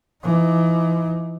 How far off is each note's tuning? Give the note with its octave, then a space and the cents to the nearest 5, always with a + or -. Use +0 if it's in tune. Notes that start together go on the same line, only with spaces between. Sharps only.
E3 +35 D#4 +40